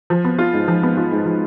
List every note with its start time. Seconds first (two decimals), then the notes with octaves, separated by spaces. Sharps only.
0.10 F3
0.25 B3
0.39 F4
0.53 G#2
0.68 F3
0.83 B3
0.97 F4
1.11 G#2
1.26 F3